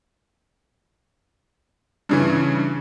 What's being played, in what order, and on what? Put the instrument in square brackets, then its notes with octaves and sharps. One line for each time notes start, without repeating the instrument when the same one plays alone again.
[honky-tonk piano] G2 C#3 E3